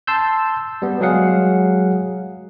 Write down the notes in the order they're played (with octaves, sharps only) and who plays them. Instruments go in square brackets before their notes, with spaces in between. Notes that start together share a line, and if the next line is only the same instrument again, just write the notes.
[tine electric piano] A5 C6 E6 G6
G3 B3
F#3 G#3 G#4 F5 F#5